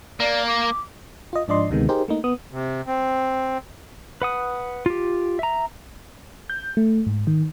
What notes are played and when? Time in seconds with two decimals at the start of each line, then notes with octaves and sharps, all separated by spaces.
0.20 A#3 D5
0.47 D6
1.33 F4 D#5
1.48 G#2 F3 D4 D5 D#5 C6
1.70 D2 C3 D#3 G#3 B3
1.89 D#4 G4 G#4 A#4 C5
2.08 A3 A#3 D#4
2.24 B3 D#6
2.52 C3
2.87 C4
4.22 B4 F#5 D#6
4.86 F4 G4
5.39 E5 A#5
6.50 G6
6.77 A3
7.07 G#2
7.27 D#3